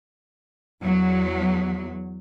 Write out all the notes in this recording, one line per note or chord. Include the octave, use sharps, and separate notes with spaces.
E2 F#3